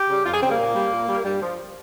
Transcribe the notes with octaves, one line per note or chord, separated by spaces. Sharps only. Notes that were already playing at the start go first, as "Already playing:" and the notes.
Already playing: G4
C#3 G3
F2 F4
G#4
C#3 G3 C4
A#3
A#2
G3
A#2
G3
G2 G3
F3